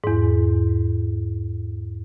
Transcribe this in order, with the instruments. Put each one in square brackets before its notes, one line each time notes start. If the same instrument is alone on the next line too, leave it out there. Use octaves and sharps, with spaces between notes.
[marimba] E2 G#2